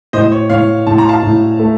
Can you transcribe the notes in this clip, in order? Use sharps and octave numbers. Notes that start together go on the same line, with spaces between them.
A2 C5 D#5
C#5
A2 C#5 F5
A2 A5
A#5
F5 A5
A2
A3